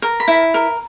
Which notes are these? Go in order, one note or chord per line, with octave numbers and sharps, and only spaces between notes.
A#4
B5
E4
A#4